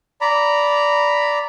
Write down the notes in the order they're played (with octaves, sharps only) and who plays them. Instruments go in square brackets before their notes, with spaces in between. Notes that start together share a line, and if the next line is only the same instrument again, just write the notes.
[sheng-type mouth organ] D5 A#5 B5